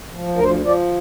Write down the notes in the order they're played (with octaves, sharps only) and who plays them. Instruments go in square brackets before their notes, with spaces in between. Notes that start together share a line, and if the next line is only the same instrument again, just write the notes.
[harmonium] F3
D2
A#4
F3 C5
F3
D5